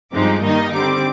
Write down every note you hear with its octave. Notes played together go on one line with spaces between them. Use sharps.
G2 F3 G#3 C4 D#4 D6
D#3 G3 A#3 D#4 D#5
D3 G3 C4 D6